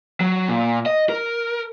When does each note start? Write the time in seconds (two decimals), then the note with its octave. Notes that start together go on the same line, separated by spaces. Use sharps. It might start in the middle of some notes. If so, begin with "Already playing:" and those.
0.20 F#3
0.48 A#2
0.86 D#5
1.09 A#4